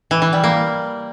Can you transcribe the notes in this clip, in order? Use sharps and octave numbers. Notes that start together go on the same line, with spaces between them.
E3
E3
G3
A#3